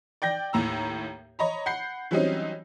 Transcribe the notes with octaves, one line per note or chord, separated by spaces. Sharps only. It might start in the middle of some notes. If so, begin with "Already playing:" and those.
D5 G5 G6 A#6
D#2 A2 A#5 E6
C#5 D#5 A#5 B5
F#5 B5 G6 C7
E3 F#3 G3 C4 C#4 D#4